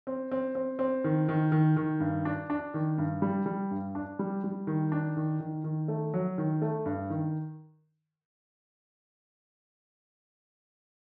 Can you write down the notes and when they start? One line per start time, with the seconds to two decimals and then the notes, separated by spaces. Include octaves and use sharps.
0.07 C4
0.32 C4
0.55 C4
0.79 C4
1.04 D#3
1.29 D#3
1.52 D#3
1.77 D#3
2.00 G2
2.25 D4
2.50 D4
2.74 D#3
2.98 G2
3.22 G3
3.46 G3
3.71 G2
3.95 D4
4.19 G3
4.44 G3
4.67 D#3
4.92 D4
5.17 D#3
5.40 D#3
5.64 D#3
5.88 A3
6.14 F#3
6.38 D#3
6.62 A3
6.85 G2
7.10 D#3